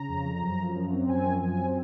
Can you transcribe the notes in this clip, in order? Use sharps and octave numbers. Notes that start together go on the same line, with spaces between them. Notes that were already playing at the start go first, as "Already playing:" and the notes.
Already playing: C#3 A#5
F2
F3
F#2
F3
F#2
C4
F#2 G#5
F3
F#2 G#5
C4